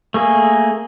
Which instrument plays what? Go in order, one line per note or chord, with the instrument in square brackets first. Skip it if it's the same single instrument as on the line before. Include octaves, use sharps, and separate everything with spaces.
[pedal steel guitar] A3 A#3 G#4